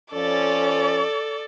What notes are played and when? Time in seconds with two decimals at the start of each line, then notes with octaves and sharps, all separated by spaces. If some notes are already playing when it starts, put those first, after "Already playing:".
0.13 F2 F3 C#4 A4 D5